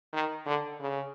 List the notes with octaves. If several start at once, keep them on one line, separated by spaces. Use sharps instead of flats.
D#3
D3
C#3